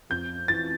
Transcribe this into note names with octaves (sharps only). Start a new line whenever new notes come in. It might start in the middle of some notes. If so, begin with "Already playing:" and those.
F2 G6
E3 A6